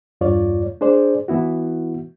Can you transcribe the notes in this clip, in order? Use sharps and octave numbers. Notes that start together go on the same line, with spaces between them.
E2 G2 F4 C#5 D5
D4 G#4 C5 D5
E3 B3 E4 F#4